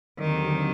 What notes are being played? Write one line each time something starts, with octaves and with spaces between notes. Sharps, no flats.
D#2 D3 D#3 F#3 C4 G4